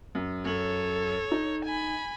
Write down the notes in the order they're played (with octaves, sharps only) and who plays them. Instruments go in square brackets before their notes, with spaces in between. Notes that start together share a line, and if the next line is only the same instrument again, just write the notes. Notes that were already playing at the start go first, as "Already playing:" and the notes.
[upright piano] F#2
[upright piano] F#2 F#7 [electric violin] A4 C#5
[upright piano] D#4
[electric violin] G#5 B5